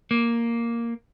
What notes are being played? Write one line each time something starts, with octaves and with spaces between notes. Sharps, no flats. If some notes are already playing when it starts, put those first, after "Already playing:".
A#3